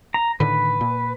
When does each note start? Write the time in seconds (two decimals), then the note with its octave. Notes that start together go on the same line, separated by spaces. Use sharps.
0.14 A#5
0.40 A2 D3 D#3 B4
0.81 A#2